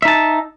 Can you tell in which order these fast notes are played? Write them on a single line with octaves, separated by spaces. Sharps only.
E5 D#4 A5